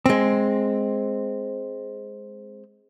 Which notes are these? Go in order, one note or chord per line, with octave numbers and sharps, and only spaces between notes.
G#3 C4